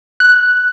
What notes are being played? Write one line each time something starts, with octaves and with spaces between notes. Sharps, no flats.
F#6